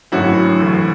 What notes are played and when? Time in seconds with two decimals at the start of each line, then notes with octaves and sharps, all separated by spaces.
0.12 G#1 F#2 D3 F#3 A3 E4 F#4
0.60 D2 C3 E3